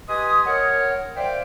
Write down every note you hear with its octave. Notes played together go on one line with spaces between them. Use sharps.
G4 B4 D#5 G#5 C6 D#6
A#4 C#5 F#5
C5 D5 E5 F5 G5